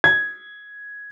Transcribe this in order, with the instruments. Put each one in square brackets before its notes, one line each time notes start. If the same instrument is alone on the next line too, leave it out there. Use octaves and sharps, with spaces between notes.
[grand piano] G#6